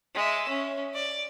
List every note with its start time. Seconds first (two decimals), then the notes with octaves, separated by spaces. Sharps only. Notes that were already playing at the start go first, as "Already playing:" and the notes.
0.15 G#3 E5
0.48 C#4
0.94 D5